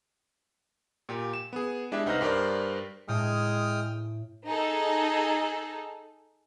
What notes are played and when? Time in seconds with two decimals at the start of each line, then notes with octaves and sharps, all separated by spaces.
1.09 A#2 G4
1.33 E7
1.53 B3 G#4
1.92 G#3 D4 E4 G4 E5
2.06 C2 D#4 B4 C5 F6 A#6
2.21 G2 G4 A#4 C5 D5
3.08 A2 G#3 G5 D#6 F6
4.46 D#4 G#4 A4